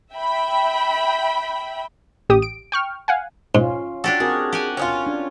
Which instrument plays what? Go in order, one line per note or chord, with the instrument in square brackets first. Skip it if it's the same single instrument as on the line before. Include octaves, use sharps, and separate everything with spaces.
[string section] E5 G5 B5
[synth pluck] A1 G4 D#6
D7
G5 C#6 F6
F5 F#5 G#5
[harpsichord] G#2 [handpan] C#4 F4
[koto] D4 G4 A4 [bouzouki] F#4
[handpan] C4 F#4 A#4 [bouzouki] G#4
[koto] G4 F#5 G#5
[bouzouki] C#4 D#4 F4
[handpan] D4